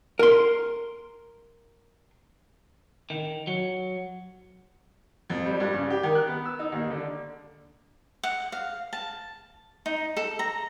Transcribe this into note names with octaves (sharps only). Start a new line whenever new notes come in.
A#4 C6
D#3
F#3
F2
G3
G2
C#3
G4
D#3
F#6
B3
E6
D#4
D#2
D3
F#5
F5
A5
D#4
A4
A#5